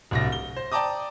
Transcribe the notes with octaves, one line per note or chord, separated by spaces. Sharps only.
D1 C2 A#6
G7
C5
D5 G5 A5 A#5 D6 D#6